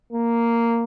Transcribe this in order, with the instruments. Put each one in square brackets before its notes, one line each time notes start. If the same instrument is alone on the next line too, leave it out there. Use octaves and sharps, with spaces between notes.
[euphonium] A#3